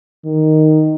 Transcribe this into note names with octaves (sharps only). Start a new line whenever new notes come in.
D#3